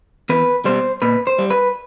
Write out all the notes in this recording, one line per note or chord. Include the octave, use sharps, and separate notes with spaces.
E2 B4
B2 G3 C5
A#2 B4
C5
G3
B4